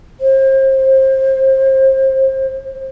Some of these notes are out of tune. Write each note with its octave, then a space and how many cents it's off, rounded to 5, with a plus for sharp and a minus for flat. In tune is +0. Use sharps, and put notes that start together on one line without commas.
C5 +30